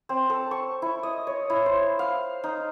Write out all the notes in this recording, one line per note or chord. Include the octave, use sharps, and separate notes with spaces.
C4
A4
C#6
E4
D#5
C#5
E4
C5
F5
D#4